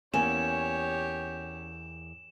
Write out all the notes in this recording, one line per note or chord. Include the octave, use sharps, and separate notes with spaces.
E2 A#3 C#4 G4 C#5 E7